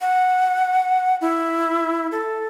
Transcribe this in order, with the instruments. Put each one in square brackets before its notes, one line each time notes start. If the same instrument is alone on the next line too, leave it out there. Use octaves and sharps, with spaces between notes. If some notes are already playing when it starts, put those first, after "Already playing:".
[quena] F#5
E4
A4